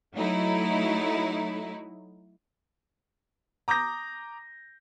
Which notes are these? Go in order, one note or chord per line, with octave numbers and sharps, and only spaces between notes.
F#3 A3 D#4 E4
A#5 D6 D#6 G6 A#6